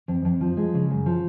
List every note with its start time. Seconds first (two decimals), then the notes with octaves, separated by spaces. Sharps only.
0.08 F2
0.25 F2
0.41 F3
0.57 G#3
0.74 C#3
0.91 F#2
1.06 F3